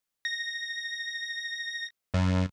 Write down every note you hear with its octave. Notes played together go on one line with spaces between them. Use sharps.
A#6
F#2